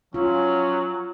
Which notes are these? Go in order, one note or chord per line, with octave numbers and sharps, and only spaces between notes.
F#3 C#4 F4